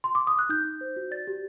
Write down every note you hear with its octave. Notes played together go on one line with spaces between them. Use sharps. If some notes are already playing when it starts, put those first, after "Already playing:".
C6
D6
D#6
F#6
D#4 G6
D#4
C5
F#4
D5 A6
G4